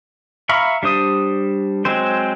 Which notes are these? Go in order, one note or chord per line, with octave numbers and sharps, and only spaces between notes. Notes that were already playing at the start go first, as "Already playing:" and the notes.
E5 F5 A#5 B5 C#6
G3 D4 C5 D#6
F#3 G#3 C4 C5